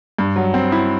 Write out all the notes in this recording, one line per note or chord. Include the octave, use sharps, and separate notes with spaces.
G2
F#3
C4
E4